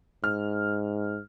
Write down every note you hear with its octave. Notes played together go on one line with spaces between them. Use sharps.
G#2 F6